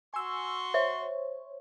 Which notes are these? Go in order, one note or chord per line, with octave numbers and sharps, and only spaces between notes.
F#4 G#5 C6 C#6 E6
C5 C#5 E5